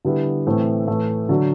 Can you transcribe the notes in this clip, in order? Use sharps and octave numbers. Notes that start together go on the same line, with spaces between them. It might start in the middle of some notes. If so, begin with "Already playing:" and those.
D3 G3 B3 E4
A2 E3 A3 C4
A2 E3 A3
D3 F#3